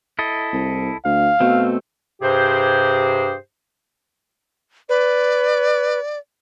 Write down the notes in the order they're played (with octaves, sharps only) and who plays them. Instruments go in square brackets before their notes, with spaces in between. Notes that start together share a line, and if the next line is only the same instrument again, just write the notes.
[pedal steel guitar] E4 A4 D#5
[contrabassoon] C2
[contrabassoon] D2 [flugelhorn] F5
[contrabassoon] B2 [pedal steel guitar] A3 C4
[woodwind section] G2 C3 G4 G#4 C5
[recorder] B4 [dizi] D5